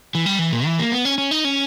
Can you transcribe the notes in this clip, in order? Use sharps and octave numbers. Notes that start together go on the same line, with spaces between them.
E3
G3
E3
A#2
E3
A#3
B3
C#4
C#4
D#4
C#4